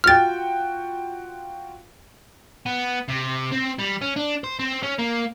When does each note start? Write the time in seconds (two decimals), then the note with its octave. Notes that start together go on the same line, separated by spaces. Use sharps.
0.04 F4 F#4 G5 F6 A6
2.66 B3
3.08 C3
3.52 C4
3.79 G3
4.01 C#4
4.16 D4
4.44 C5
4.59 C4
4.83 C#4
4.99 A#3